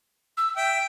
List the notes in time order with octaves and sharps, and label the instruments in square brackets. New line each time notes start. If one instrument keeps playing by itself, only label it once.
[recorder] E6
[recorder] E5 [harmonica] G5